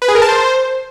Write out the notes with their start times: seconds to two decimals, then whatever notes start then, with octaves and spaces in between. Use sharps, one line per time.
0.02 B4
0.08 G#4
0.15 A#4
0.22 A5
0.29 C5